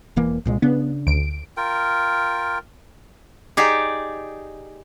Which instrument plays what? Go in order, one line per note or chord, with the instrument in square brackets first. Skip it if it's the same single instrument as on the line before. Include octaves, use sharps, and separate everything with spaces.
[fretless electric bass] E1 E3 A#3
C2 A#2 G#3
[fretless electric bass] C#3 D4 [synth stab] B3
[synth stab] D2 D7
[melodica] F4 A#4 G5
[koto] D#4 G4 G#4 D5